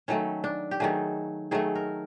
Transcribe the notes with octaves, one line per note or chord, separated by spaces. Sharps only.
D#3 F#3 A3 C#4
D4
G4
D#3 F#3 A3 G#4
D#3 F#3 A3 G#4
A#4